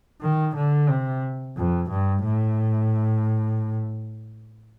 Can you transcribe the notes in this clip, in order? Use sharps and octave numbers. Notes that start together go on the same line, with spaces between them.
D#3
D3
C3
F2
G2
A2